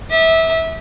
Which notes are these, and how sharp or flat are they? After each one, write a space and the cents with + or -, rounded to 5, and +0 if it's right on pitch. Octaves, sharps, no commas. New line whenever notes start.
E5 -20 D#6 -45